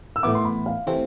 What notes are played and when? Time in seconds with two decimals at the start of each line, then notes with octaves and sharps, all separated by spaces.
0.16 E6
0.23 A2 E3 B3 E4 D6
0.35 C6
0.45 B5
0.66 F5
0.87 C3 E3 A3 C4